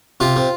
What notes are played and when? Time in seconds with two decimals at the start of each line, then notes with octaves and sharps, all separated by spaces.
0.20 C3 F4
0.36 C3